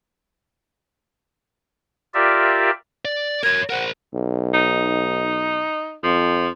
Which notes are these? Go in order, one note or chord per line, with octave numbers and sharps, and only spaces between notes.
F4 G4 A#4 D5 E5
D5
A#4 C#5 G#6
A#4 C5 F#5
B1
D#4
F2 F3